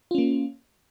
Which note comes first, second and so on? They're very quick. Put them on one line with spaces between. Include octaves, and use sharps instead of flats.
F4 C#4 A#3